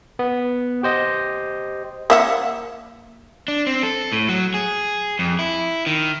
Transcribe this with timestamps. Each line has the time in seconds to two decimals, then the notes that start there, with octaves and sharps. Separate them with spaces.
0.19 B3
0.83 G4 C5 D#5
2.10 A#3 E5 F#5
3.48 D4
3.67 C4
3.83 A4
4.12 A2
4.29 F#3
4.54 G#4
5.19 F2
5.39 E4
5.86 D#3